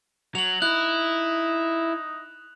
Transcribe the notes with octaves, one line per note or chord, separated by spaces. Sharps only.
F#3 F7 F#7
D#4 E4 F#6